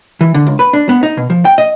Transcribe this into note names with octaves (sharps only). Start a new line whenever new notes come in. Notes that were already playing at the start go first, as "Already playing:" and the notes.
E3
D3
C#2
B4
D4
B3
D#4
B2
F3
G5
D#5